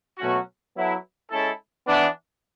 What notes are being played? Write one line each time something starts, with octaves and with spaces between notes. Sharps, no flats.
B2 F#3 A3 C#4 F#4
F#3 B3 E4 A4
G#3 C#4 E4 A4
E3 B3 D4